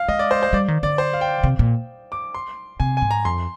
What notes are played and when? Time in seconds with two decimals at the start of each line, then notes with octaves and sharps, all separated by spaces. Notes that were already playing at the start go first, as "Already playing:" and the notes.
Already playing: F5
0.08 G#3 D#5
0.19 D5
0.31 C5
0.43 C5
0.53 G3 D5
0.68 D#3
0.83 D3 D5
0.98 C5
1.13 F5
1.21 G5
1.43 C3
1.59 A#2
2.12 D6
2.35 C6
2.80 C3 G#5
2.97 G#2 G#5
3.11 A#5
3.25 F2 C6